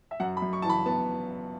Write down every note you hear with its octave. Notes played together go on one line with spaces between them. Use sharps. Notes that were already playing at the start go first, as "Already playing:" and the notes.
E5
F#2 F#5
B5
F#2
C#6
E3 A5
B5
B3 A5